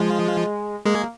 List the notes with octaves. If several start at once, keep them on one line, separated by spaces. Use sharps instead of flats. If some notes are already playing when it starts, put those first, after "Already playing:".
Already playing: F3 G#3 F4
G#3 A#3 G#4